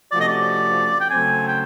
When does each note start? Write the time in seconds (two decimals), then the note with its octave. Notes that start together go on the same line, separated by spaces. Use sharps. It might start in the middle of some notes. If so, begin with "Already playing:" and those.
0.12 C3 F3 A3 C#4 F#4 D5
0.20 D#5
0.28 D5
1.00 G5
1.10 C#3 F#3 A3 C4 G#5
1.48 G5